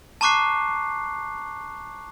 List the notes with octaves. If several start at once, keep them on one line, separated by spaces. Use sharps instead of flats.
A5 A#5 C#6 D6 F#6 C7